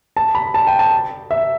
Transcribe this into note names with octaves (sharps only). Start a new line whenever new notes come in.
A5
B5
A5
G5
A5
E5